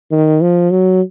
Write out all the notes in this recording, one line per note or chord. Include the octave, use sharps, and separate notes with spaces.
D#3
F3
F#3